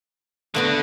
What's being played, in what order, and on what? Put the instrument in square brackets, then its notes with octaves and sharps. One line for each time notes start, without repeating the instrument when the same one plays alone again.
[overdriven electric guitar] D3 [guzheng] A3 B3 F#4